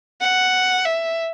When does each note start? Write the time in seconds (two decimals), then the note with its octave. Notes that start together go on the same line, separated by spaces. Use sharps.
0.21 F#5
0.85 E5